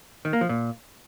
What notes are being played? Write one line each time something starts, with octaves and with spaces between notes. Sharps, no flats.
D#3
A#3
F3
A#2